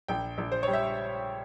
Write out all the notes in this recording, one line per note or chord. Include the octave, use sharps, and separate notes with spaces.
A#1 G5
A#1
C5
G3 C#5
E5